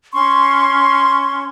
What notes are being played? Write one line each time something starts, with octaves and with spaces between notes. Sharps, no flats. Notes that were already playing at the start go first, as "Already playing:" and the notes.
C#4 C6 C#6